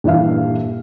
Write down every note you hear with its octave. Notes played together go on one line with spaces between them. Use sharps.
D#1 G2 E3 E5 F5